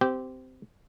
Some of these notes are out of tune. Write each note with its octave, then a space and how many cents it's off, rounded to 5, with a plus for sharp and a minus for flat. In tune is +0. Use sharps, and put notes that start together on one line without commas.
C4 -20 G4 -15